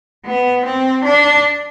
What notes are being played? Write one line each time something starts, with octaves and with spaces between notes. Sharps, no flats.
B3
C4
D4